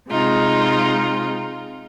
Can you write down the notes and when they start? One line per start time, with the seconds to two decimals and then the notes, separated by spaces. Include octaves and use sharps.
0.11 C3 G#3 D#4 F4